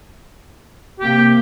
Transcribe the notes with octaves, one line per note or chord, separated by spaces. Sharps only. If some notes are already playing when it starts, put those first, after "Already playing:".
C3 A#3 G4